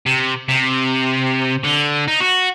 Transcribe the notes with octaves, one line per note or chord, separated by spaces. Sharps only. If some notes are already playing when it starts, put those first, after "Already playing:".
C3
C3
D3
D#4
F#4